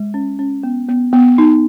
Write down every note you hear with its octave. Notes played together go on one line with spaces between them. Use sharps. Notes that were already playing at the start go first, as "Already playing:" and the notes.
Already playing: G#3
C#4
C#4
B3
B3
B3
D#4